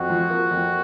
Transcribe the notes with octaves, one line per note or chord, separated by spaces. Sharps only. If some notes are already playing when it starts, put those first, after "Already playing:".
Already playing: F2 F#4
F3
A#3
F2